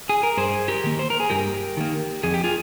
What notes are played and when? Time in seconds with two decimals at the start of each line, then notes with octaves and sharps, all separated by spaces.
0.09 G#4
0.23 A#4
0.37 G2 G#4 C5
0.68 G4 A#4
0.84 D#3 A#3
0.99 C5
1.10 A#4
1.20 G#4
1.30 G2 G4 A#4
1.77 D#3 A#3
2.23 F2 G#4
2.34 G4
2.44 F4 G#4